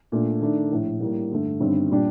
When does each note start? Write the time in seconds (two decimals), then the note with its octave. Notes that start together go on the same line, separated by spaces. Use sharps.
0.12 A#2 A3 D4
0.41 D#3 A3 D4
0.71 A#1 A2 A3
1.00 A2 G3 A#3
1.31 G2 D3 A3
1.60 G1 G2 D#3 G3 C4
1.90 A#2 G3 D4 G4